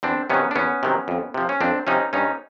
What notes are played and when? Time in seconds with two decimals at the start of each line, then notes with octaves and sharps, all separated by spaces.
0.03 E2 C4 D4
0.30 C3 D#3 F#3 B3 C#4
0.51 D4
0.56 E2 B3 C#4
0.83 C3 D#3 F#3
1.08 F2
1.34 C3 F3
1.49 C#4
1.61 F2 C4 D4
1.87 C3 F3 C#4 D#4
2.13 G2 C#4 D#4